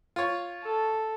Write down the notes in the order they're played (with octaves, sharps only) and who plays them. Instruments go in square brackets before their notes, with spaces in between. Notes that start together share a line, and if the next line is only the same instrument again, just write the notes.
[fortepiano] F4 C#5
[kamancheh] A4